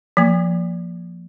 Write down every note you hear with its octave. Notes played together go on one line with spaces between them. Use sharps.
F3 A#3